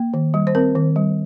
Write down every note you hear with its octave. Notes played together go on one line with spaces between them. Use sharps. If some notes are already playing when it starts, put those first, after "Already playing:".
Already playing: A#3
D#3
G3
C5
C4 A#4
D#3
G3